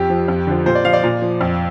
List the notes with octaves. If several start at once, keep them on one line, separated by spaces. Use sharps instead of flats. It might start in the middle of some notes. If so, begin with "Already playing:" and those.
Already playing: F2 G4
F3
F2
D3 F3
A#2 C5
D5
F3 F5
D5
A#2
F3
F2